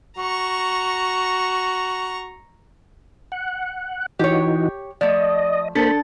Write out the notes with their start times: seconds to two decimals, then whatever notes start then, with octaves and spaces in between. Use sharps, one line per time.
0.18 F#4 A#5 C#6
3.32 F#5
4.19 E3 D#4 F#4 G4 C#5
5.01 F3 A3 D5 D#5
5.75 A#3 D4 A4 C5 B5 A6